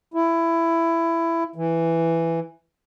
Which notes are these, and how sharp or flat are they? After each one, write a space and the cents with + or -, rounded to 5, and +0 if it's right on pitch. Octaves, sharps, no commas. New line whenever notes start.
E4 +15
E3 +5